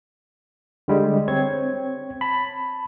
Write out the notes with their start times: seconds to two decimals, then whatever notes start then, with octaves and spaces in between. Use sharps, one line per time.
0.88 D3 G3 G#3
1.28 C4 C#5 G#6
2.21 A5 B5